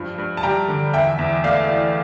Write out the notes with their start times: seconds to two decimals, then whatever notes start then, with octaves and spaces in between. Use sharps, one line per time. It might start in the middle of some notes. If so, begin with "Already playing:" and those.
Already playing: G2 F3
0.18 G2
0.37 A5
0.43 G3 G5 A#5
0.68 D3
0.93 E2 E5 G5
1.19 E2
1.44 A3 D5 F5
1.69 E3